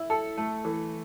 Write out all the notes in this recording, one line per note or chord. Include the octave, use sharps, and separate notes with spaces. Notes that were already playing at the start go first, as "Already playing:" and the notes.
Already playing: E4
A4
A3
E3